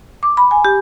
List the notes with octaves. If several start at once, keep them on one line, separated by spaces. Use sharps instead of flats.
D6
B5
G#5
G4